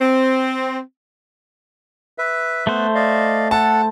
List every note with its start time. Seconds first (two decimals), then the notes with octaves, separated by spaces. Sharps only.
0.01 C4
2.18 B4 E5
2.67 A3 B3 A4 B4 C5
2.95 D5 D#5 F5
3.51 A4 F#5 A5